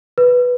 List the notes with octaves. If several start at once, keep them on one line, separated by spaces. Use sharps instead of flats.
B4